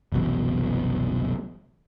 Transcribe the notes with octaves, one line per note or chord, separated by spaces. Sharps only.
F#1 C2 B2 E3